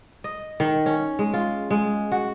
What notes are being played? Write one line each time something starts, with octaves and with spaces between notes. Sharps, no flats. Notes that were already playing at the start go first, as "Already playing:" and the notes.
D#5
D#3
C#4
G#3
F4
G#3
F#4